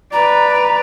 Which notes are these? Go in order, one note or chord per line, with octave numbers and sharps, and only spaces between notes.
B4 D5 A#5